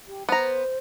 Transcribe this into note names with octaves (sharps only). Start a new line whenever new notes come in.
G4
B3 C5 A#5